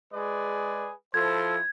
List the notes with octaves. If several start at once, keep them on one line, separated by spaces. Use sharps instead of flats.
G#3 G#4 B4 D5
F3 E4 A4 C5 G#6